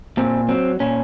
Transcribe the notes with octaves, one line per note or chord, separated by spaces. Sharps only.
A#2 C4
F#3 C4
A#2 C#4